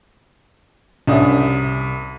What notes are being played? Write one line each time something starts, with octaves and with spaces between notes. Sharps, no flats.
C2 C#4 D4 E5 D#6